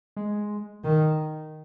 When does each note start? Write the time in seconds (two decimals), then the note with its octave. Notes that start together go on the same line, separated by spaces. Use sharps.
0.16 G#3
0.84 D#3